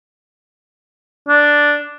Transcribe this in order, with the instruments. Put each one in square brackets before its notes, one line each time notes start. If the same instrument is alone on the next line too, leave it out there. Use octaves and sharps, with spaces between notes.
[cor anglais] D4